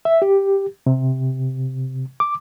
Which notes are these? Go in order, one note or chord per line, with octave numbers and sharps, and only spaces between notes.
E5
G4
C3
D6